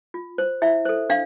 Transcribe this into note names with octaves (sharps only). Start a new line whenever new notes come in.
F4
C5
E4 E5
A4 C5
D4 F5